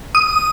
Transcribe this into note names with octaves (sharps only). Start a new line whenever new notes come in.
D#6